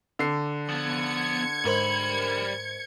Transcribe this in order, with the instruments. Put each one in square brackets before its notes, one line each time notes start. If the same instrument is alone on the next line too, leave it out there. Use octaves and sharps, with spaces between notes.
[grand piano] D3 C7
[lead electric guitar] F3 B3 [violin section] G#6 C#7
[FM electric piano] G#2 A#4 C5 [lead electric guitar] G3 B5